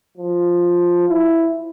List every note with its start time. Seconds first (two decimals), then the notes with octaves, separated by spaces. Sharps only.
0.17 F3
1.09 E4